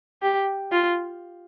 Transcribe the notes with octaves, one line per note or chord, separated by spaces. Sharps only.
G4
F4